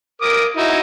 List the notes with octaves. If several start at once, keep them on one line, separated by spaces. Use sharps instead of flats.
A#4 D6 D#6
D#4 E4 F#4